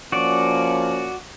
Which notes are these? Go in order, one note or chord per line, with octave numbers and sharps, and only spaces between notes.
F3 A#3 C#4 F#4 D5